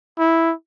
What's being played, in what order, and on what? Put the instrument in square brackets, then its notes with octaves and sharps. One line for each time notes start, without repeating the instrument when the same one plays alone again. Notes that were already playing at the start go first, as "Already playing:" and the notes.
[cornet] E4